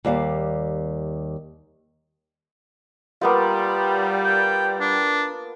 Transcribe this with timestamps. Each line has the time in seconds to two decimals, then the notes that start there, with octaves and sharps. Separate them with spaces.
0.05 D#2 G3 F5
3.21 G3 A#3 B3 F4
4.24 G5
4.80 D4